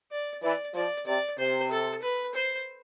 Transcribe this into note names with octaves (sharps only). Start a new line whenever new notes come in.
D5
E3 D5
F3 D5
C3 D5
C3 C5
A4
B4
C5